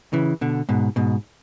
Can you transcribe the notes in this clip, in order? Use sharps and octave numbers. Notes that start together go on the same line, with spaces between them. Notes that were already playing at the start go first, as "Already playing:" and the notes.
C#3 E3
B2 D3
G#2 B2
G#2 B2